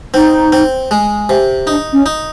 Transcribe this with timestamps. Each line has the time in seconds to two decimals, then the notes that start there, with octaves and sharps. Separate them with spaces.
0.14 C4 D#4
0.52 C4
0.91 G#3
1.29 C3
1.67 D4 D#4
1.93 C#4
2.06 D#4